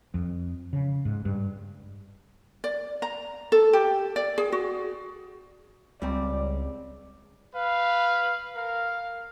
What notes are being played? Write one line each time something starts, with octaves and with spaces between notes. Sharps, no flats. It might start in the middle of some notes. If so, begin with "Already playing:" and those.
F2
C#3
G#2
G2
D5
A#5
A4
G4
D5
G#4
F#4
C#2 G3 C4 D5
B4 F5
A#4 F5